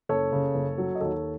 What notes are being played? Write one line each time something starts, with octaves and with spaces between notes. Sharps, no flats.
F#1 A4 C#5
C#3
F#1
F#3
D#5
D#2 A4 C#5